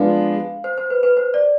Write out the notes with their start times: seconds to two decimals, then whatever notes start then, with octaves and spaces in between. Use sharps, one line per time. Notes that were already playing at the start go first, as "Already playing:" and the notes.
Already playing: F3 G#3 B3 D4 F5
0.64 C5
0.78 C5
0.90 B4
1.03 B4
1.17 C5
1.34 D5